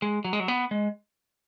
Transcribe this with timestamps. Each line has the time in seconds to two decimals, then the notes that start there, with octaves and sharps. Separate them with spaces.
0.02 G#3
0.25 F#3
0.33 G#3
0.40 F#3
0.48 B3
0.71 G#3